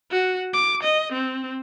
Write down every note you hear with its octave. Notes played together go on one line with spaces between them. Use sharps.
F#4
D6
D#5
C4